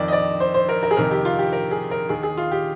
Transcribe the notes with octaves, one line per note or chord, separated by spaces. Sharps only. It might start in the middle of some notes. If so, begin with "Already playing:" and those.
Already playing: F2 D#3 D5
D#5
D5
C5
C5
A#4
A#4
G#4
F2 C3 D#3 A#4
G4
F4
G4
A#4
G#4
A#4
D#2 D#3 G#4
G#4
F4
G4